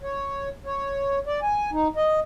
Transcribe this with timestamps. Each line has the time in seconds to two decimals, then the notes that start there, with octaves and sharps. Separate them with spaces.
0.03 C#5
0.66 C#5
1.27 D5
1.42 G#5
1.72 D#4
1.96 D#5